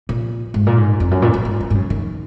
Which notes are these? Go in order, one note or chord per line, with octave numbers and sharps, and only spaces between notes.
A#2
G#2
A#2
G#2
F2
F#2
A#2
F#2
G#2
F#2
G#2
F#2
D#3